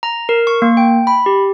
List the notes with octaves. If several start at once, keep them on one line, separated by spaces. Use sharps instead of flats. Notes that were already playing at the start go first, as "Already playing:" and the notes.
A#5
A#4
C#6
A#3
G5
B5
G4